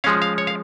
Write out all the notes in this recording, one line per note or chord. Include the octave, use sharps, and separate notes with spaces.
F3 G#3 C#4 F5
F5
C#5
F5